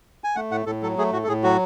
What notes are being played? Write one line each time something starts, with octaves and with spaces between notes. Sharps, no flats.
G#5
A3 F#5
A2 F#5
A2 A4
F#3 A4
A3 G#4
A2 F#4
A4
A2 G#4
F#3 F#4